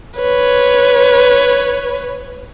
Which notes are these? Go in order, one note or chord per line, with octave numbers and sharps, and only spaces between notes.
B4 C#5